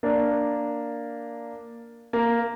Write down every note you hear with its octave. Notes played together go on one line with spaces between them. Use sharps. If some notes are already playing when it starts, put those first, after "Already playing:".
A#3 D4
A#3